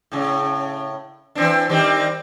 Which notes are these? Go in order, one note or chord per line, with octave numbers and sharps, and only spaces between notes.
A2 C#3
E3 C4 D4
D#3 G3 C4